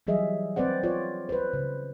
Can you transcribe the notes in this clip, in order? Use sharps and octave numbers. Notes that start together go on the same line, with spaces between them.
E3 F#3 G3 G#4 D#5 E5
C4 B4 C5 D5 F#5
F4 C#5 D5
B4 C5
C#3